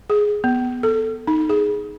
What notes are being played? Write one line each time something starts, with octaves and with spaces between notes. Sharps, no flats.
G#4
B3
A4
D#4
G#4